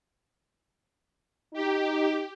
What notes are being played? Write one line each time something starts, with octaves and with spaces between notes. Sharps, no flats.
D#4 G4